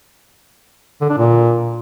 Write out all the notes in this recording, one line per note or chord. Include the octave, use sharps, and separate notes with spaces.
D3
D4
A#2